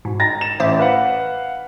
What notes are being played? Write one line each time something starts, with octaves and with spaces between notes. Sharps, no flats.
G#2 B2
A#5 A6 A#6
E7
A1 C5 E5 D6
B4 F5 F#5